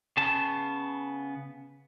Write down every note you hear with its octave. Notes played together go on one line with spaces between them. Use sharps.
C#3 B3 A5